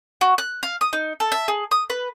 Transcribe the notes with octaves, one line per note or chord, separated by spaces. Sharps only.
F#4
F#6
F5
D#6
D#4
A4
E5
G#4
D#6
B4